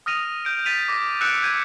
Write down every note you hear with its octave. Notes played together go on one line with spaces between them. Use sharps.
D#6 F6 A#6 D#7 F7
G6 D7
A6 B6 D#7 F7
D6 A#6 D#7
E6 F#6 G6 C#7 D7 E7
G6 G#6 D#7